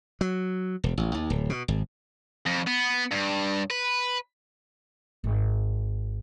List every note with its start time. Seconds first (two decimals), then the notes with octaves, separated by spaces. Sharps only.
0.21 F#3
0.84 E1
0.98 A1
1.15 D#2
1.30 D1
1.50 B2
1.68 G#1
2.46 F2
2.67 B3
3.12 G2
3.70 B4
5.24 G#1